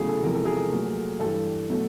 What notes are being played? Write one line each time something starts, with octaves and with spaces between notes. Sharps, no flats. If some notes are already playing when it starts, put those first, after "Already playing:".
Already playing: E2 C#3 F#3 A3 G#4
A4
E2 C3 F3 G#3 A#4
A4
G#4 A#4
A#2 F#3 A3
G2 E3 G3 A4
B2 F#3 A3